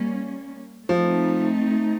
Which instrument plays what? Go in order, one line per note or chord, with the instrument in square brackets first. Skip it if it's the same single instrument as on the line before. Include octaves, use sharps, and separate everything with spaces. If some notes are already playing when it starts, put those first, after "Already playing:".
Already playing: [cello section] G3 A#3 C#4
[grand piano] F3 [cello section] A3 C4 D#4